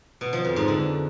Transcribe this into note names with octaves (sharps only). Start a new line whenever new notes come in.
B2
F3
F2
G#2
D3